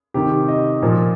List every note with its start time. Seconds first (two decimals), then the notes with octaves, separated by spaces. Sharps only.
0.14 C3 D#3 G4
0.48 D#5
0.82 A#2 F3